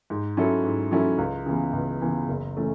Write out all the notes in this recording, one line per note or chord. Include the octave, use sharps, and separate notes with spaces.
G#2
F#3 C#4 E4 A4
G#2
F#3 C#4 E4 A4
C#2
C#3 E3 B3
C#2
C#3 E3 B3
F#1
E3 A3 C#4